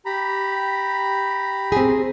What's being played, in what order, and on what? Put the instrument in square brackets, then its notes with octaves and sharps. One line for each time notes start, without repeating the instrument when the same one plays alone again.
[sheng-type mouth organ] G4 A#5 B5
[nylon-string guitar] C4 G#4